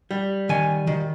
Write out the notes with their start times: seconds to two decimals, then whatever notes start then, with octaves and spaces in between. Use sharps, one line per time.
0.11 G3
0.49 D#3 G#5
0.87 D#3